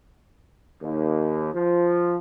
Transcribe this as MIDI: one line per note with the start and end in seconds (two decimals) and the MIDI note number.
0.81 1.49 39
1.53 2.16 53